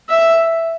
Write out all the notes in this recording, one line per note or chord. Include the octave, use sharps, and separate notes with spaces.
E5